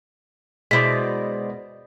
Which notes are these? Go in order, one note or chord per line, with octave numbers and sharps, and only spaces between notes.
B2 G#3 E4 C5 D5 B6